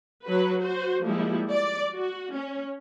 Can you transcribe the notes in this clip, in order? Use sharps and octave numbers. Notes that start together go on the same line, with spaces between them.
F#3 F#4 B4
F#4 C5
F3 G3 G#3 A#3 E4
D5
F#4
C#4